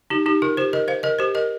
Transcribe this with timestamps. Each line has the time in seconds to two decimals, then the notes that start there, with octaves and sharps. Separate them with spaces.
0.10 D#4 G4
0.26 D#4 G4
0.42 F4 A#4
0.57 G4 C5
0.73 A#4 D#5
0.88 C5 F5
1.03 A#4 D#5
1.19 G4 C5
1.35 A#4 D#5